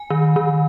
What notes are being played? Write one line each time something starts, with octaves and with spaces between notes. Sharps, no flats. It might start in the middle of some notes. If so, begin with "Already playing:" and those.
Already playing: G#5
D#3
D#3